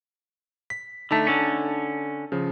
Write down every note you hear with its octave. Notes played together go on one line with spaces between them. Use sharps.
B6
D3 A3 D#4 A5
D3 C#4
C#3 F3